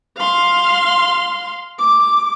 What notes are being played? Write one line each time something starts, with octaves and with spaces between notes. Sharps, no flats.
F5 C6
D6